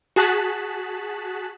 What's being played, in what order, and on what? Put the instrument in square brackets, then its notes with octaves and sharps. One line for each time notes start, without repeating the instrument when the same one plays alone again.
[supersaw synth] F#4 G#4 A5 F#6 B6